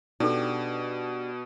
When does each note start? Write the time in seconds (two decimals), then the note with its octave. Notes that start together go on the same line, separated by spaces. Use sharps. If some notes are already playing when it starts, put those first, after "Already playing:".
0.20 B2 D4 D#4 G4 A4